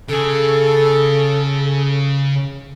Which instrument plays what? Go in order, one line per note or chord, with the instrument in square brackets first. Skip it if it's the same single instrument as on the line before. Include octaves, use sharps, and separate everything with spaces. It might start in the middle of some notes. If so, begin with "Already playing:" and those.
[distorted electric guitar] C#3 G#4 [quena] A4